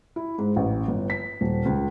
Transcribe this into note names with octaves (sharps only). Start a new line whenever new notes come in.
E4
G#2
A1
G1
B6
D#1
C#2